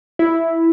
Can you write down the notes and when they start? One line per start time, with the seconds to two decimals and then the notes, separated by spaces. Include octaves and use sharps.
0.19 E4